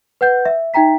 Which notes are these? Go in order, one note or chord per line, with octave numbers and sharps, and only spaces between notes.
B4 F#5 G6
E5
D#4 E5 G5 A#5 B6